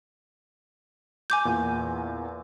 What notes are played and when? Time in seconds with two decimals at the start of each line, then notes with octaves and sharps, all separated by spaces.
1.30 G#5 D6 G6
1.45 E2 A#2